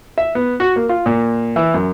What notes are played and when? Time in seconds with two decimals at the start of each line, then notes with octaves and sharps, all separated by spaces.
0.18 E5
0.35 B3
0.60 F#4
0.76 A#3
0.89 F4
1.06 A#2
1.56 E3
1.74 F#2